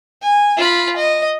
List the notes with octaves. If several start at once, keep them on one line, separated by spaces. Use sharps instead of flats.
G#5
F4 B5
D#5